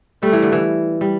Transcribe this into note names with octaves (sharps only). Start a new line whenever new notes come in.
G3 A3
E3
D3
E3
G3